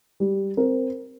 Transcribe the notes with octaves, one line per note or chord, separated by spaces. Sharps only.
G3
C4 A#4